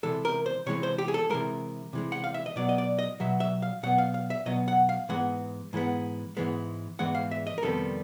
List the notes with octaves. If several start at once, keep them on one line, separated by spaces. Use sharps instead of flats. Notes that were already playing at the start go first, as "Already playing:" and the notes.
C3 E3 G#3 A4
A#4
C5
C3 E3 G#3 C#5
C5
G4
G#4
A4
C3 E3 G#3 A#4
C3 E3 G#3
F#5
F5
E5
D#5
B2 F#3 B3 D5
D#5
D5
D#5
B2 F#3 B3 E5
E5
F5
B2 F#3 B3 F#5
F5
F5
E5
B2 F#3 B3 D#5
F#5
F5
G#2 E3 G#3 B3 F#5
G#2 E3 G#3 B3
G#2 E3 G#3 B3
G#2 E3 G#3 B3 F#5
F5
E5
D#5
A#4
F2 C3 D#3 G3 B3 A4